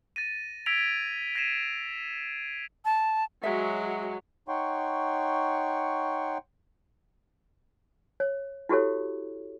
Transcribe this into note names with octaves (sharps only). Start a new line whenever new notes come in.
A6 A#6 D#7
E6 G#6 A#6 B6 D7 F7
G#6 A#6 C7 D#7 E7
A5
F#3 G#3 E5
D#4 C#5 F#5 G5 C6 C#6
C#5
E4 F#4 G4 A4 C#5